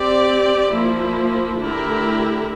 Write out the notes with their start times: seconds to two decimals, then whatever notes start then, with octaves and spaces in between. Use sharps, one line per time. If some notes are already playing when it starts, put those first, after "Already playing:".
Already playing: C4 G4 D5
0.73 F3 A#3 E4
1.60 D3 A3 E4 G4 A#4